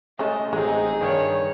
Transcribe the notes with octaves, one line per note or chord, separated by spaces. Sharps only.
G#3 A3 C#4 D#5 A5
A1 G#3 C4 D#4 G#4
G2 D#3 C#5